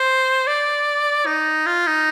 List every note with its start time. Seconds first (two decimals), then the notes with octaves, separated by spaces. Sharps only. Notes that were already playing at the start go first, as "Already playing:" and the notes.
Already playing: C5
0.47 D5
1.26 D#4
1.66 F4
1.87 D#4